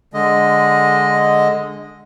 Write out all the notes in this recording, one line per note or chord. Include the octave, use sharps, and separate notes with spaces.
D3 G#3 D#5